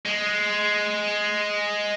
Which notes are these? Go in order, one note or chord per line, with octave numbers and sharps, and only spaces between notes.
G#3